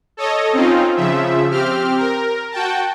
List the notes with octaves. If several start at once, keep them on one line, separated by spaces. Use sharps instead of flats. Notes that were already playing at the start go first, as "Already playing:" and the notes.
A4 C#5 D#5
C4 C#4 D#4 F4
C#3 F3 E5
C4 G4 F6
A#4
F#4 G5 A5